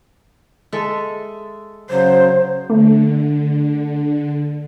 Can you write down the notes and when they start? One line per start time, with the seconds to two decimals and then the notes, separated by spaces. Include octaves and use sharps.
0.72 G#3 A4 E5
1.89 C#3 F#3 C5
2.70 D3 A3